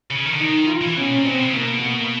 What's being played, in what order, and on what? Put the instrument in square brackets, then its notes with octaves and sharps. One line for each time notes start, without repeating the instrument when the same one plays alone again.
[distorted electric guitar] C#3
D#3
D3
[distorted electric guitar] D#3 [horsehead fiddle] D#4
[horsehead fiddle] F4
[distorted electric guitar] E3
[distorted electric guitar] B2 [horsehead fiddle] C#4
[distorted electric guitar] A#2
[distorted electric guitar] B2 [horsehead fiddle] C4
[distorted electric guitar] C#3
[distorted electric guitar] B2 [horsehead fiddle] A#3
[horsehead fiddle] A#3